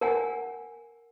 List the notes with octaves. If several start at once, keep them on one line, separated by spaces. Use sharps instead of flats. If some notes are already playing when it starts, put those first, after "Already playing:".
A#4 F#5 G#5